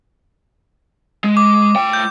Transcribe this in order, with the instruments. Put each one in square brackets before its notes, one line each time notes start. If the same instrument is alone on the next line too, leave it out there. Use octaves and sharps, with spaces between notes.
[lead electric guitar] G#3
[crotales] D6
[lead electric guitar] A3 G5
[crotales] G6